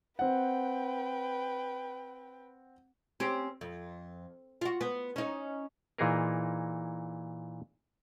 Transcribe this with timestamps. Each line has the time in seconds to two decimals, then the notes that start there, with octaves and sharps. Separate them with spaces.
0.19 C4 B4 F#5 G5
3.20 C4 C#4 G4
3.61 F2
4.61 F4 F#4
4.81 B3
5.16 C#4 D#4
5.98 A#2 E3 D#4 G#4 A#4